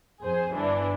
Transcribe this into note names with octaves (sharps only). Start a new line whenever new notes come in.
F2 G#4 C5
G1 E3 D4